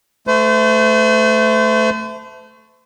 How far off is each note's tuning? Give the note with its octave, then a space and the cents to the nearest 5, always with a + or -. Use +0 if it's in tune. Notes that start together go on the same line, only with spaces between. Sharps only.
A3 +0 C5 -40